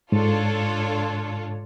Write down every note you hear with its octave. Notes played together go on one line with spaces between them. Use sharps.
G#2 D4 F4 A4 C#5